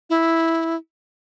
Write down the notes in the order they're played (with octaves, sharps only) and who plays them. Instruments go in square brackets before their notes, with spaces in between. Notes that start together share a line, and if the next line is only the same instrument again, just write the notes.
[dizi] E4